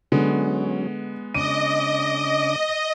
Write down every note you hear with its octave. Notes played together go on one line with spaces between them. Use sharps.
D3 F#3 G#3 B3 C#4
C#3 D4 D#5 D6 D#7